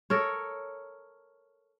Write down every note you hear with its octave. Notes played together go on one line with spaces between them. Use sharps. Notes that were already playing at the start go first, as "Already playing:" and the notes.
A4 A#4 C#5